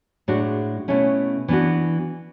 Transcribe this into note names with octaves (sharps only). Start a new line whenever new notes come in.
A2 G#3 D4 F#4
B2 A3 C#4 E4
E3 B3 D4 F#4